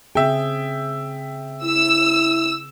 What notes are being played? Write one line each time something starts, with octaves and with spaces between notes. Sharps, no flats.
C#3 C4 G#4 E5 G5
E4 E6